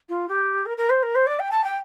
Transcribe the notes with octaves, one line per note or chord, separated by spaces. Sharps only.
F4
G4
A#4
A#4
C5
A#4
C5
D5
G5
A5
G5